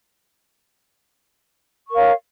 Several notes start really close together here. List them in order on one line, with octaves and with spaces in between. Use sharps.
C#6 A#4 F5 C#5